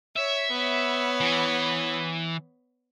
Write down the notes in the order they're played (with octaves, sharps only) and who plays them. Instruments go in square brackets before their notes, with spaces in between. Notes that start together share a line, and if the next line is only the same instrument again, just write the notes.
[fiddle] C#5 [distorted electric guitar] E5
[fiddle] B3 C#5
[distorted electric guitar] E3